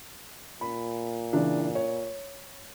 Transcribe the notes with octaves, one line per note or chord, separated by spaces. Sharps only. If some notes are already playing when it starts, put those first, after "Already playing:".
A#2 B5
C#3 E3 D4
C#5